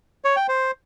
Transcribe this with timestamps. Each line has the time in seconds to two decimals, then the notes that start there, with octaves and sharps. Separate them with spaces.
0.25 C#5
0.36 G5
0.48 C5